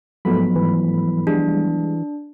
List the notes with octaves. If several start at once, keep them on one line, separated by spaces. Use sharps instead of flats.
G#2 F3 F#3 A3 B3 B5
E3
G3 G#3 D4